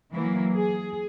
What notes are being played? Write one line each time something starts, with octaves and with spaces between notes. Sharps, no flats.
E3 F#3 A#3
G#4